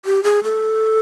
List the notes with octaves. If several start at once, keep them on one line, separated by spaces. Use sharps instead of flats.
G4
G#4
A4